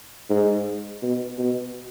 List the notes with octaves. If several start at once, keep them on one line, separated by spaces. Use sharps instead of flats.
G#2
B2
B2